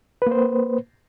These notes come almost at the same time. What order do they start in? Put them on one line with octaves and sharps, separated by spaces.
B4 A#3 C5